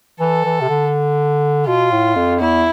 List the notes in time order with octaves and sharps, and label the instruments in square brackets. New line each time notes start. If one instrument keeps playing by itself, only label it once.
[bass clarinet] E3 [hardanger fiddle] A4
[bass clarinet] E3
C3
D3
[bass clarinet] B2 [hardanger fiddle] F4
[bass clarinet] A2
F2
[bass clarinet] E2 [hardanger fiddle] E4